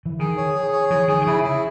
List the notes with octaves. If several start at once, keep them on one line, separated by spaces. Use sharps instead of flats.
E3
D#3 G#4
C#5
G#4
C#5
E3 G#4
D#3 G#4
D#3
C#3 E4
E4